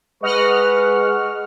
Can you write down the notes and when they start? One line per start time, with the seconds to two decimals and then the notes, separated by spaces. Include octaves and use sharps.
0.23 G#3 B4 D#5 F#5 C#6 F6